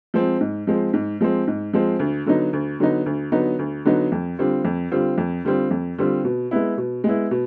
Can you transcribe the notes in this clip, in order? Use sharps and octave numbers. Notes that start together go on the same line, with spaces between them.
F3 G#3 C4
G#2
F3 G#3 C4
G#2
F3 G#3 C4
G#2
F3 G#3 C4
D2
D3 F#3 B3 D#4
D2
D3 F#3 B3 D#4
D2
D3 F#3 B3 D#4
D2
D3 F#3 B3 D#4
F2
D3 G3 C4 F4
F2
D3 G3 C4 F4
F2
D3 G3 C4 F4
F2
D3 G3 C4 F4
B2
G#3 B3 E4
B2
G#3 B3 E4
B2